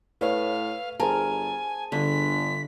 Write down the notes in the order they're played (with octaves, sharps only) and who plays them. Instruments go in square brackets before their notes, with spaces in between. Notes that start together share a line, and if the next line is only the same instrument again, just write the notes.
[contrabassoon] A2 [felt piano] B4 C#5 [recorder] F5
[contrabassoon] G1 [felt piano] G#4 C5 A5 [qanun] A#4 [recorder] G#5
[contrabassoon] G1 [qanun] D3 [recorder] B6